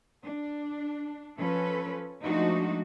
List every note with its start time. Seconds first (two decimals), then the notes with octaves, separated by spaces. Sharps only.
0.24 D4
1.37 F3 C#4 A4 B4
2.23 F3 G#3 A3 D4 D#4 F#4